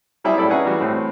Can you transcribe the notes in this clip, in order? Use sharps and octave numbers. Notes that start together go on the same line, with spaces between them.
F#3 G3 C4 E4 G#4
A2 E4 A4 D5 B5
C#4 D#4 G#4 B4 F#5
E3 G3 E4 F#4
A2 C4